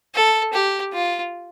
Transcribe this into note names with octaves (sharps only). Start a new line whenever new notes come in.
A4
G4
F4